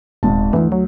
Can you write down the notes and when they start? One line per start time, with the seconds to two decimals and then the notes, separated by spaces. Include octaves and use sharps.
0.23 D#1 G#1 G#2 A5
0.53 D2 E3
0.72 F#3